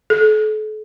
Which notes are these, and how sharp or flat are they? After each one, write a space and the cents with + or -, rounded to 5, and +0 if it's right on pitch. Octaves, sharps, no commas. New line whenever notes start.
A4 -40